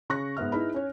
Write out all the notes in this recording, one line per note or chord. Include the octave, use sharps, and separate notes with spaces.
C#3 C#6 F#6 A#6
G#2 B3 E5 F6
D#4 E4 G#4 B4 B5
C#4 C#5